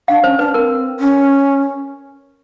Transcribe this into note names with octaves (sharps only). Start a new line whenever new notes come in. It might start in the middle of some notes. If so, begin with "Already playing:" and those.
D4 F5
C#4 C5
D4 B4
C4 A#4
C#4